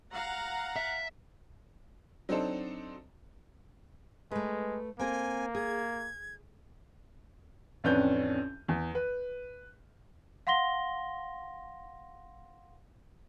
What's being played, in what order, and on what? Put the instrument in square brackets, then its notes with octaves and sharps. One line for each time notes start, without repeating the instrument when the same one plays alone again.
[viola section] F5 F#5 A#5
[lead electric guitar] E5
[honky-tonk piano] F#3 C4 D4 D#4 A4 C5
[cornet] G#3 [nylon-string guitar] A3 B4
[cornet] A#3 [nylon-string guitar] C4 A4 A#4 [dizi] G#5
[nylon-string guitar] G#4 [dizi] G#6
[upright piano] A1 F2 C#4 D4 B4 G6
E2
B4
[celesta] F5 F#5 C6 A#6 G7